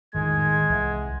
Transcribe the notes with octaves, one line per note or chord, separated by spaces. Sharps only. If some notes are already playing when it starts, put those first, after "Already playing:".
A#1 F2 A2 D#3 G#3 G#6
C2 E3 E5 F#5